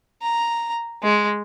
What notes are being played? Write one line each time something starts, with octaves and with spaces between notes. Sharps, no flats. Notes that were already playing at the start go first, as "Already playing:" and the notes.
A#5
G#3